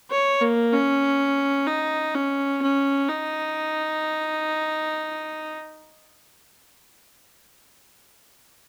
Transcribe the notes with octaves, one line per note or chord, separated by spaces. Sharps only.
C#5
A#3
C#4
D#4
C#4
C#4
D#4